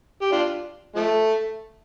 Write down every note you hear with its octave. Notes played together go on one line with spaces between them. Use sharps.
G4
D4 F4
F3 A3